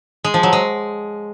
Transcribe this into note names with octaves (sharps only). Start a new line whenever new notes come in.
G#3
F3
F#3
G#3